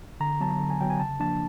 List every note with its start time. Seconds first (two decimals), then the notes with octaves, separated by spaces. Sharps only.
0.20 D3 A#5
0.41 F#3 B3 A5
0.60 D3
0.70 G#5
0.81 F#3 B3 G5
0.90 G#5
1.00 C#3 A5
1.20 F3 A#3 D4 A5